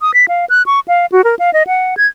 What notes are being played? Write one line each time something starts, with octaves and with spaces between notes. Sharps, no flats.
D#6
B6
F5
F#6
C#6
F5
F#4
A#4
F5
D#5
F#5
G#6